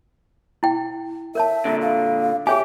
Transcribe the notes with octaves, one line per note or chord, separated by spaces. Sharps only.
E4 G5
A#4 C#5 E5 A5
A#2 D3
F5
G4 G#4 C#5 E5 G#5